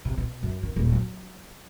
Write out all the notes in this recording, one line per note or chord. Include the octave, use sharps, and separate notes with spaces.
C3
B2
F#2
D#3
D#1
F#3